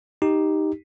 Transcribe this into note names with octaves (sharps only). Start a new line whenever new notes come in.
D#4 G4